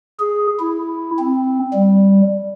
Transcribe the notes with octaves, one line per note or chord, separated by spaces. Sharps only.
G#4
E4
C4
G3